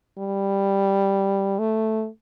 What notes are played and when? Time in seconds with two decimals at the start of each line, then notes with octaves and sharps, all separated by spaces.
0.18 G3
1.59 A3